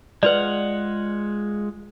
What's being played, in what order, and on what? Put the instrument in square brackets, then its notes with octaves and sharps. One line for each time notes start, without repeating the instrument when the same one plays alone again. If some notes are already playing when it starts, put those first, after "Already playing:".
[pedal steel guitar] G#3 F4 F#5 [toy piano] B4 D5